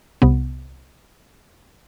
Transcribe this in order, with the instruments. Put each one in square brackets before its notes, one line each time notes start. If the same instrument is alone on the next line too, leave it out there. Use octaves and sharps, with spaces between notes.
[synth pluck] C2 C3 B3